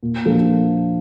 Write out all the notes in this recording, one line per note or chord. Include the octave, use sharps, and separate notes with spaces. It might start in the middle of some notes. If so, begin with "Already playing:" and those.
A#2
F3 A#3 D4 A4